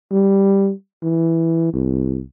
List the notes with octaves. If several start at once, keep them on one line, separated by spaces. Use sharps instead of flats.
G3
E3
C2